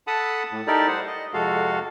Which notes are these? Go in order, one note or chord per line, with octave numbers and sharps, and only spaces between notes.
A4 F#5 A5 B5 D#6
A2
D#4 E4 G4 A4 A#4 D5
G3 C5 F#5
D#5
F2 C3 G#3 F#4 A4 F5